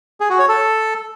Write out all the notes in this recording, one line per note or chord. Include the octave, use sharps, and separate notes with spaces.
G#4
F#4
C#5
A4